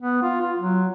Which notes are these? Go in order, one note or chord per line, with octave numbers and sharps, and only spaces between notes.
B3
F4
F4
F#3